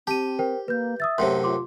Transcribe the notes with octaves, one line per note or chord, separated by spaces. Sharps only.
C4 G4 A5 D#7
A#4 C5 G5
A#3 B4 G6
E5 D#6 E6 A6
F#2 A2 C3 C6
F4 C6 D6